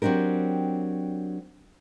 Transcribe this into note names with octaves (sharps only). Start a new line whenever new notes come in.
F#3 C4 D4 G4 A#4